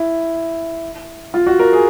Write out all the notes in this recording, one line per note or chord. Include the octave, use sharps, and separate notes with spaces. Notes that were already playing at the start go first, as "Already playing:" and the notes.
Already playing: E4
F4
F#4
A#4
G#4